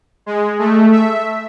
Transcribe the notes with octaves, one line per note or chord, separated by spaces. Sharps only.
G#3
A3
E5